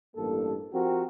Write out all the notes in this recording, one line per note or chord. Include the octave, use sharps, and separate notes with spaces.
A1 G2 A#3 A4
F3 C4 F#4 G4 A#4